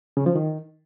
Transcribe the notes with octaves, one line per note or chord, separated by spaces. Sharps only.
C#3
F3
D#3